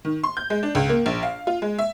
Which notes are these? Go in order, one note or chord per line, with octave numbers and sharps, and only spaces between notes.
D#3
C6
G6
G#3
D4
C#2
A#3
A#1
F5
F4
G#3
E5